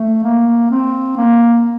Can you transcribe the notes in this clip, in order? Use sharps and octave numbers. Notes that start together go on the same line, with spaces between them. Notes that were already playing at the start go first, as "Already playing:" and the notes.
Already playing: A3
A#3
C4
A#3